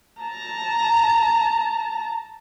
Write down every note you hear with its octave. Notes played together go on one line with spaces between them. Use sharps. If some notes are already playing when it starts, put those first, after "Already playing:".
A5 A#5